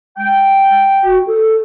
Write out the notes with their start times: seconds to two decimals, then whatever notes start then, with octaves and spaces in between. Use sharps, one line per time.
0.18 G#3 G5
1.03 F#4
1.27 A4